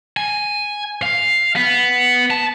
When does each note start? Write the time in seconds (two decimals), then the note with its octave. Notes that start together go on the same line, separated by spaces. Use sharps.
0.17 G#5
1.02 F5
1.56 B3
2.31 A5